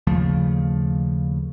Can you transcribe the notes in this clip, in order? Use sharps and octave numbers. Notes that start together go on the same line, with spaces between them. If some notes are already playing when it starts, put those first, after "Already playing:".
D#2 C#3 F3 A3